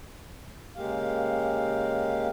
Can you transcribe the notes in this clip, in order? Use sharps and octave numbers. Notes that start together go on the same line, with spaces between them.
C#3 G#3 A#3 G4 F5